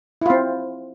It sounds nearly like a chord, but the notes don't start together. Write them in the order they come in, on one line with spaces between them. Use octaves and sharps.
E4 F4 C4